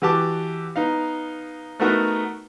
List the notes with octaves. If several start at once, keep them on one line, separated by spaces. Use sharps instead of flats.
E3 F#4 G4 A5 D6
B3 D#4 F5
A3 B3 D#4 F#4 A#4 B4